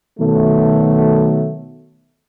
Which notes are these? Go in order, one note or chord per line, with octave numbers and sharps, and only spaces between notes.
B2 D#3 F#3 A3